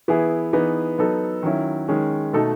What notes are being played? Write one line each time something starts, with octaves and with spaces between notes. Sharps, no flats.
E3 B3 E4 G#4
E3 B3 D#4 G#4
F#3 B3 D#4 A4
D#3 F#3 C#4 E4
D#3 G#3 C#4
B2 A3 D#4 A4